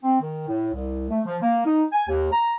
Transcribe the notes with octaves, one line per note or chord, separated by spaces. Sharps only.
C4
D#3
A2
C2
A3
F3
A#3
D#4
G#5
D#2
A#5